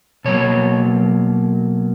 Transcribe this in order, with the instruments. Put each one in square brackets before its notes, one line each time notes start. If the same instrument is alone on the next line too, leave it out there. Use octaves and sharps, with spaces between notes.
[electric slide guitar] B2 F#3 A#3 C#5